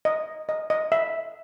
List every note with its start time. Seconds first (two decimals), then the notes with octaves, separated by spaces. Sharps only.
0.05 D#5
0.49 D#5
0.70 D#5
0.92 E5